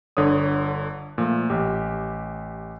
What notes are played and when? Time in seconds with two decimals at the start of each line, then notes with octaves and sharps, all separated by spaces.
0.17 G1 D3 A4 C#5 D#6
1.18 A#2 F3 A3
1.50 A1 G4